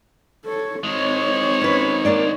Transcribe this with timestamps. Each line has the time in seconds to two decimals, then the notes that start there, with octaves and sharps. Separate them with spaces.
0.45 A4 C#5
0.83 D#3 G#3 C4 C#5
1.61 C#4 B4
2.05 A#3 D4 D5